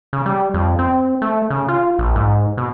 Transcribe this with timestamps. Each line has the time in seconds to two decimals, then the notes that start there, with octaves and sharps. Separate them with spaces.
0.13 C#3
0.26 G3
0.54 F2
0.79 C4
1.22 A3
1.50 C#3
1.68 F4
1.99 A#1
2.15 G#2
2.57 B2